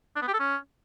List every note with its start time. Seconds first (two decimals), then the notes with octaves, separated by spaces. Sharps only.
0.16 D4
0.22 B3
0.27 G4
0.33 A4
0.39 C#4